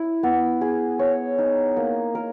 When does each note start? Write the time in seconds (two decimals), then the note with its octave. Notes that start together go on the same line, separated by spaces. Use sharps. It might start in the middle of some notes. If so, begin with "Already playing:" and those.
Already playing: E4
0.23 B3
0.61 G#4
0.99 C#5
1.38 D#4
1.76 A#3
2.15 A#4